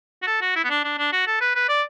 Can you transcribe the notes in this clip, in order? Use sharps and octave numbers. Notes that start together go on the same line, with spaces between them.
F#4
A4
F#4
E4
B3
D4
D4
D4
F#4
A4
B4
B4
D5